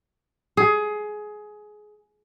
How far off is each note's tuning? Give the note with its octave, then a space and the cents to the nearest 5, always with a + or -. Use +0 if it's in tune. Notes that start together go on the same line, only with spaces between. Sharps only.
G#4 +20